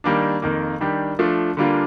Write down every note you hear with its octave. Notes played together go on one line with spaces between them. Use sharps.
D#3 G3 A#3 D4
F2 D#3 A#3
D#3 G3 D4 G4
F3 A3 D4 F4
D3 G3 A#3 D4 F4